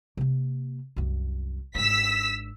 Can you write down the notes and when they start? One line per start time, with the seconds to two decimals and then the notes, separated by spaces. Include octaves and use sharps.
0.17 C3 A#3
0.96 C2 F#2
1.75 G#1 D4 E6 B6